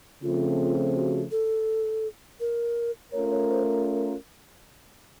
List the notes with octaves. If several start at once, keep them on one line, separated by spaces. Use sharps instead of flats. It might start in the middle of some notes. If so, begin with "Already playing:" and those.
C#3 F3 A3 C4 F4
F#4
A4
A#4
A3 C#4 F4 A#4 C#5
C#5
C5